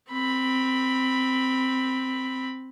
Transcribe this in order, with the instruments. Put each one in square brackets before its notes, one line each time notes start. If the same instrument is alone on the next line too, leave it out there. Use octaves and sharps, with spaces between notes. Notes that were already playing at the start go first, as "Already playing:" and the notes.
[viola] C4 B5